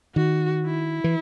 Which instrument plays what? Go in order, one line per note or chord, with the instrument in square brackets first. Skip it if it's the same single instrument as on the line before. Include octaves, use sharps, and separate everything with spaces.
[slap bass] D#3 [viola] F#4
[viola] E4
[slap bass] E3